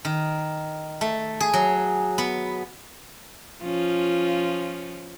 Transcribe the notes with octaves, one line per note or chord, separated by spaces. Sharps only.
D#3
A3
G#4
F#3
B3
F3 C#4 F4